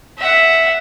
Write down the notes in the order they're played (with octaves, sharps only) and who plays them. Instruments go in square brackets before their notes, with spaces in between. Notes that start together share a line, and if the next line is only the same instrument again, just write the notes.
[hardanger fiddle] E5 F#5